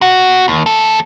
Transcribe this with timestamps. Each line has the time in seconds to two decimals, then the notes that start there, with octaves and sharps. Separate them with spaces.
0.01 B2 F#4
0.48 D#2
0.66 D#2 A4